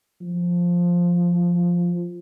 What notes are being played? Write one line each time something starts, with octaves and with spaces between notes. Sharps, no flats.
F3